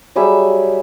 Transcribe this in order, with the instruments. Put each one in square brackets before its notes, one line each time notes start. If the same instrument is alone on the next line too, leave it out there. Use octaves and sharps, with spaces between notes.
[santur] F#3 G3 G#4 E5